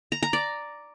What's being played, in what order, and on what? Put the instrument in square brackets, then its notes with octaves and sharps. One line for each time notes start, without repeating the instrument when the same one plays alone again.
[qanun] A#5
A#5
D5